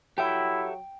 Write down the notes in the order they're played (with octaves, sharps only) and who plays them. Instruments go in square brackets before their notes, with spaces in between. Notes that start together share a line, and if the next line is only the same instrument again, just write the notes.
[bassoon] F#3 [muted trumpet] E4 [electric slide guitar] G4 A4 E5 [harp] G5